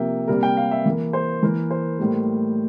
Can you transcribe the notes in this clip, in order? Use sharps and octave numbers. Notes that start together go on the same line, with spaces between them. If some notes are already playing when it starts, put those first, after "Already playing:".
Already playing: C3 F3 A#3 E5 G5
C3 G3 A#3 A#4
G5
F5
E5
E3 A#3
C5
E3 A#3 A#4
C5
A2 G3 A#3